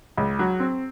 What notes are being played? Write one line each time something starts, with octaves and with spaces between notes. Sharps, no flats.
C#2
F#3
C4